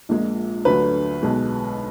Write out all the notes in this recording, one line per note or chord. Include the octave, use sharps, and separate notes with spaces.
A#1 A#2 G#3
D2 D3 F#3 B4
B1 B2 G#3